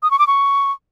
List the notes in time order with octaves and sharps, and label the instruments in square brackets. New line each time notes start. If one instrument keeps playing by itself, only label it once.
[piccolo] D#6
C#6
D6
C#6